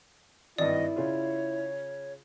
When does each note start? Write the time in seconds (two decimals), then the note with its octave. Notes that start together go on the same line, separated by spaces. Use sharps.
0.58 G#1 G2 E4 D5 D#5
0.96 C#3 F4 C#5